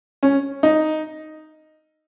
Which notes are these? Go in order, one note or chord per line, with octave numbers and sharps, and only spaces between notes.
C#4
D#4